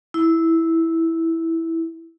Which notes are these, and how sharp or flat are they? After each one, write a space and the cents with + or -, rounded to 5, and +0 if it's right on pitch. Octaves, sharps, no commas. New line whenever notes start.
E4 -5